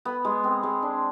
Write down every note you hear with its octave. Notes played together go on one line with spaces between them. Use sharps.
B3
G#3
C4
G#3
D4